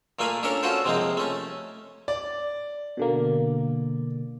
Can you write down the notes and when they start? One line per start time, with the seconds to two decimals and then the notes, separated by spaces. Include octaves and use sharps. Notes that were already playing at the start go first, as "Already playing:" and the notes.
0.19 A#2 A3 A#3 F5 G#5 B5
0.43 C#4 D4 A4 A#4 C#5
0.63 C#4 F4 F#4 A4 C5
0.85 C3 F3 G#3 A#3 C4
1.17 A3 C#4
2.08 D5
2.97 B2 D3 A#3